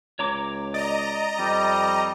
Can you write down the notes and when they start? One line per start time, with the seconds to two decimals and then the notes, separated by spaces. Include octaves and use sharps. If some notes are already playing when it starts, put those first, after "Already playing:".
0.19 C#2 C#5 A#5 D6
0.74 D5 D#5 A#5
1.39 F2 G3